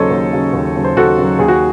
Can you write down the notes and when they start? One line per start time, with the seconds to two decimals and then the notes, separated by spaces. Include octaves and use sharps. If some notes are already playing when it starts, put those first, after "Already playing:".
Already playing: D#2 C#3 F#3 A4 C5 C#5 D#5
0.11 D#2
0.33 C#3 F#3
0.53 D#2
0.76 C#3 F#3
0.84 C5
0.96 D#2 F#4 A4
1.18 C#3 F#3
1.39 D#2 G#4
1.48 F#4